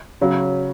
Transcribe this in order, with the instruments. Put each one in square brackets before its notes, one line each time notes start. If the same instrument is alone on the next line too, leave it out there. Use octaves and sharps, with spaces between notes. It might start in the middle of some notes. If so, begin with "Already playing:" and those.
[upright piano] C#3 F#3